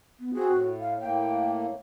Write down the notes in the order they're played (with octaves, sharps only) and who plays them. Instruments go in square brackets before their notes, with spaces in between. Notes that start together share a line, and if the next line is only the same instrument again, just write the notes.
[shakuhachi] B3
[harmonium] C4 G#4 [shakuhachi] F#4
[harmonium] A2
[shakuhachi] F5
[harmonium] A2 A#3 [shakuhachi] G5